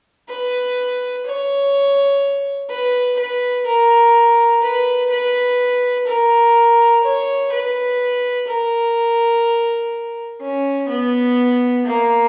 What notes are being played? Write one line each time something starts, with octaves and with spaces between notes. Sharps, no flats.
B4
C#5
B4
B4
A#4
B4
B4
A#4
C#5
B4
A#4
C#4
B3
A#3